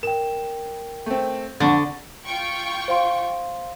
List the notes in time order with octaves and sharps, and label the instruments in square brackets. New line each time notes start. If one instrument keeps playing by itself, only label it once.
[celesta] A#4 G5 [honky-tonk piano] E7
[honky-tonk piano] A3 C4
[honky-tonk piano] F2 A6 [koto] D3 [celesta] F#5 A5 C#6
[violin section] F4 G5 C#6
[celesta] C5 F5 C6